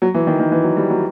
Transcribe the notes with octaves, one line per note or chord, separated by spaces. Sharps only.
F#3
E3
D#3
D#3
E3
F#3
G3
F#3